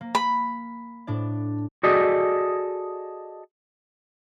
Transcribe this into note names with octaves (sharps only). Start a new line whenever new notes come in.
A#3
B5
A2 D4 D5
F#4 G#4 A4 D5 D#5